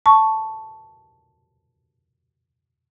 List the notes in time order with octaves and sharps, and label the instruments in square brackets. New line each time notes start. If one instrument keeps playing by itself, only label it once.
[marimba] A5 C#6